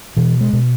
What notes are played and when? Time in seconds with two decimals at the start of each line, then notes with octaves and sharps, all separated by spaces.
0.17 B2 E3
0.41 G#3
0.53 B2